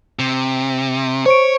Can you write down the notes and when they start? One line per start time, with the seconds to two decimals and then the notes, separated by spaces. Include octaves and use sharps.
0.19 C3
1.26 C5 C#5 C#6 D7